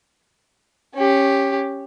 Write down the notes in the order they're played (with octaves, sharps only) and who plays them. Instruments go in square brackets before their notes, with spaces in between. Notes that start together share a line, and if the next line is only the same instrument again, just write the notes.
[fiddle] C#4 G4